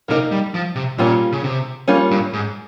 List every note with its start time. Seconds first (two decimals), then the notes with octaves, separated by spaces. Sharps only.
0.08 C3 A#3 D#4 A#4 D#5
0.32 G3
0.54 F3
0.75 C3
0.98 A#2 G3 A#3 C#4 F4
1.32 C#3
1.44 C3
1.88 G3 A#3 C#4 F4
2.11 G2
2.33 G#2